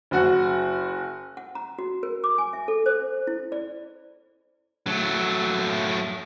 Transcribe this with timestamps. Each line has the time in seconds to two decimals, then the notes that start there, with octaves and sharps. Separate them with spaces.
0.11 F#1 F#4 F#5
1.37 F#5
1.55 A#5
1.79 F#4
2.03 A#4
2.24 D6
2.38 G#5
2.53 E5
2.68 A4
2.86 C5
3.27 E4
3.52 D5
4.87 F#3 A3